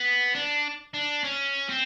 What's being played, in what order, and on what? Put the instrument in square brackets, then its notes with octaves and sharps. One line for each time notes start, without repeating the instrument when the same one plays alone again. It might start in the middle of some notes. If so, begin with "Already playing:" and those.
Already playing: [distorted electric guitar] B3
D4
D4
C#4
C4